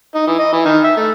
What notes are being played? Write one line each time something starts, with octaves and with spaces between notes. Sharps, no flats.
D#4
E3
D#5
E3
D#3
E5
A3